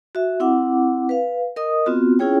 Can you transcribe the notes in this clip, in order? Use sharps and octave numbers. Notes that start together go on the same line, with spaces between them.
F#4 E5
C4 E4 F#5 D6
B4 F5
A#4 D#5 D#6
B3 C4 F4 F#4
C#4 E4 F4 G#4 C#5 G5